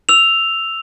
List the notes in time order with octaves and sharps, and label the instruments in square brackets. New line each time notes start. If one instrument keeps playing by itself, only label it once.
[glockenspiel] E6 F7